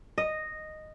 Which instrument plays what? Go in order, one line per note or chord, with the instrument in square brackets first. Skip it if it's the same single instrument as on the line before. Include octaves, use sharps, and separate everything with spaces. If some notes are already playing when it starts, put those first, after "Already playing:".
[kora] D#5